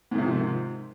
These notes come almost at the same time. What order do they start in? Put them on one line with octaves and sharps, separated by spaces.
G#2 D#3 C3 F3